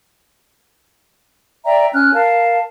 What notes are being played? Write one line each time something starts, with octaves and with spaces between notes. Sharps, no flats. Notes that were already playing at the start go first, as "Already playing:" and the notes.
D5 E5 G5 A#5
C#4 F6 F#6
A#4 F5 A5